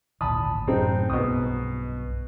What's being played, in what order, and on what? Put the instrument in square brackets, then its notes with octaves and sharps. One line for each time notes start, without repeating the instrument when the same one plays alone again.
[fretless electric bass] G#1 D2 A#2 [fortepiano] A5 B5 D#6
[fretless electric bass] F#2 A2 C3 [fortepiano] G#3 C4 D#4
[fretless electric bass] B1 G2 [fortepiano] B2 D#6